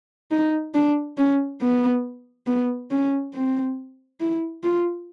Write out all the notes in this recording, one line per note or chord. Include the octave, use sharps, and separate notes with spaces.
D#4
D4
C#4
B3
B3
C#4
C4
E4
F4